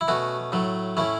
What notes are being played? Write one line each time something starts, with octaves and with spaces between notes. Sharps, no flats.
E4
B2 A3 C#4 F#4
A2 F#3 A3
A2 A3 C#4 E4